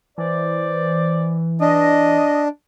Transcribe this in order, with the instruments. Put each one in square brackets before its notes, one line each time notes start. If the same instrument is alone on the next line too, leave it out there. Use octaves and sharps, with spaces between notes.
[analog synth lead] E3 [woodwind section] C5 D5
[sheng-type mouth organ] D4 [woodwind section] D#5